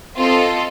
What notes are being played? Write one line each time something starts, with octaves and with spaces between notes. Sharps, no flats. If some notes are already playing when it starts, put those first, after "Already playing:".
C4 F4 A4 D#5